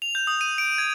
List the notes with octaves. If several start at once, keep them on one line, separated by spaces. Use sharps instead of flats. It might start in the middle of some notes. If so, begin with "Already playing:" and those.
F7
G6
D#6
D#7
D7
G#6